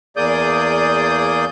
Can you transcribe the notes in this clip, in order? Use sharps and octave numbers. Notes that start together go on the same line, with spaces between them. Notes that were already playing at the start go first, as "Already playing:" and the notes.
E2 A#3 G#4 D5 D#6 G6